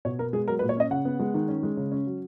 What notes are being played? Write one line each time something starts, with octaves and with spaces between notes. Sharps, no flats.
B2 C#5
B3 A#4
G#3 G#4
F#3 A#4
B4
A#2
C#5
C#4 D#5
C#3 F#5
B3
G#3
D#3
C#4
G#3
C#3
C#4
F#3